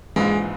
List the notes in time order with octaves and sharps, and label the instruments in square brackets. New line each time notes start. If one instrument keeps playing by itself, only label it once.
[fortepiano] A#1 G#2 E3 [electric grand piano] G#3